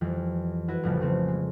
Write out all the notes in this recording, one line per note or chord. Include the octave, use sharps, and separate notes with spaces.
F2 E3 F3 G3
E4 F#4 B4
A1 F2 A2 C#3 F3 G3
C#3 A3 C4 C#4
G#3